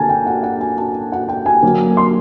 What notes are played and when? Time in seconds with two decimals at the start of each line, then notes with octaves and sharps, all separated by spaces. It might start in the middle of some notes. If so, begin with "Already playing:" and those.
Already playing: D3 A#3 G#5 A5
0.09 G5
0.26 F#5
0.43 F#5
0.60 G#5
0.78 A5
1.12 F#5
1.29 G5
1.46 G#5
1.62 D3 F#3 A#3
1.97 C6